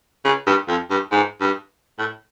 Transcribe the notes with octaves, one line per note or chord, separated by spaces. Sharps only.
C#3
G2
F2
G2
G#2
G2
A2